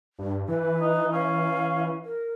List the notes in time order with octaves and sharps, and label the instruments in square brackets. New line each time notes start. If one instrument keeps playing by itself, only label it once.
[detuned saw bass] G2
[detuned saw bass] E3 [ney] B4
[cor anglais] D#4
[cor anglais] C#4 [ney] F5
[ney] A#4